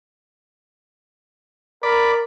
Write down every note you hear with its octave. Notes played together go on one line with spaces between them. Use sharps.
A#4 D5 B5